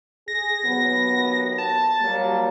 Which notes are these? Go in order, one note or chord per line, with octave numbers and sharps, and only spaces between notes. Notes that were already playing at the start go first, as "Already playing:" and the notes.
G#4 A#6
D#2 F#3 B3
A5
F#3 G3 A#3